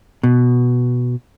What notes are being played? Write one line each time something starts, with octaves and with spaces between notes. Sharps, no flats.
B2